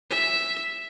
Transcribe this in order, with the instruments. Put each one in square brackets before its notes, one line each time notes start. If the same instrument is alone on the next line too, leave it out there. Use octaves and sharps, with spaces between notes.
[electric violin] E5